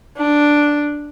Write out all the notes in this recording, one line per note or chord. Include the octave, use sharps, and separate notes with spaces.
D4